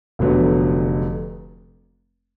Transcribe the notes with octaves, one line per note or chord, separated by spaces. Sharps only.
F1 F2 D3 F#3 B3